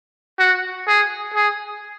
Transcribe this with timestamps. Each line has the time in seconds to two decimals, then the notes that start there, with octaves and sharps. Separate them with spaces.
0.39 F#4
0.87 G#4
1.34 G#4